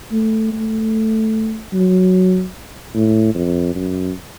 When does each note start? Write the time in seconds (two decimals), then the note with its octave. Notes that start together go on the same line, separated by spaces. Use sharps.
0.12 A3
0.53 A3
1.73 F#3
2.94 A2
3.35 F2
3.75 F#2